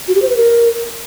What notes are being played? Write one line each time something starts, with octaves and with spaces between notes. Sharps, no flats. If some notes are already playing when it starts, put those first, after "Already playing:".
F#4
G4
C5
B4
A#4